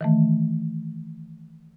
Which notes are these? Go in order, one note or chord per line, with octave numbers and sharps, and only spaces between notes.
D#3 E3 A3